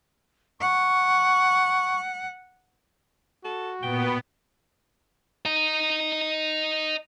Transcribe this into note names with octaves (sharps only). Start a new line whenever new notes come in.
F#5 C#6
F#4 A4
A#2 B3 G5
D#5 A#5